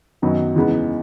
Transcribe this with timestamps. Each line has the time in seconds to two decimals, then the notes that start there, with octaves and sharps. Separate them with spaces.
0.22 F#2 D#3 F#3 B3 D#4
0.56 E2 C#3 G#3 B3 D#4